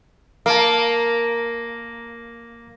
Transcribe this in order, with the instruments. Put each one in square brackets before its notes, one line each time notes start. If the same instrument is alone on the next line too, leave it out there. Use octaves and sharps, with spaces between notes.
[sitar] A#3 [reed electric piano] F5 A5